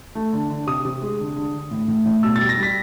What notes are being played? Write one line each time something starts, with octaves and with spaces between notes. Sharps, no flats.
A3
D3
D3
C3 D#6
C3
G#3
D3
D3
D3
A2
A2
A2
B2 E6
G3 A6
A#6
G3 B6